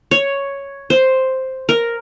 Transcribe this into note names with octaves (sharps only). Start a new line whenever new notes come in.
C#5
C5
A#4